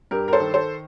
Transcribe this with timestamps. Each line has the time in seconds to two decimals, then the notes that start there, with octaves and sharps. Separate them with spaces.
0.11 G2 G4 A#4
0.28 A#4
0.33 A4 C5
0.40 D#3
0.54 A4 C5